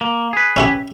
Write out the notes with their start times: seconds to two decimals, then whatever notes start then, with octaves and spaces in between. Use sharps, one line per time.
0.01 A#3
0.33 G#4 B4
0.56 C#4 E4 G4